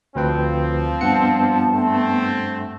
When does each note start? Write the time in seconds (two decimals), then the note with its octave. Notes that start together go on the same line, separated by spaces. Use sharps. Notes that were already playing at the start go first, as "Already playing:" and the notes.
0.16 D2 F3 C4 B4 G5
1.01 G2 B3 F#5 A5 C#7
1.74 A3 C4